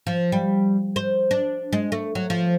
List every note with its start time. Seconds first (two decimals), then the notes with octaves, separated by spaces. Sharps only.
0.07 F3
0.32 G3
0.96 C5
1.31 D4
1.73 G#3
1.92 A3
2.15 F#3
2.30 F3